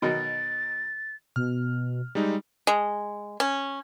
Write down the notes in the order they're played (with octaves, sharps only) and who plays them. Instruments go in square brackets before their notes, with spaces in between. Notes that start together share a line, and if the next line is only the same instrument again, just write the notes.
[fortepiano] B2 D#3 F#3 [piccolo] A6
[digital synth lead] B2 [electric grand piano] F6
[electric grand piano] G3 G#3 D#4
[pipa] G#3
C#4